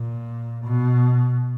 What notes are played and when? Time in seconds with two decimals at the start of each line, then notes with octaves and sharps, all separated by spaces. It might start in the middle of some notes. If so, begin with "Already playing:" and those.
Already playing: A#2
0.65 B2